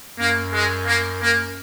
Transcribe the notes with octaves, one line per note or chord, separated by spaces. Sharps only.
F#2 A#3
G#3
A#3
A#3